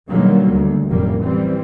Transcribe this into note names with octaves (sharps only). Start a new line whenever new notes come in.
B2 D3 D#3 F#3 G3 A#3
D2
F1 F#2 A2 C3 G3 A#3
E3 G3 C4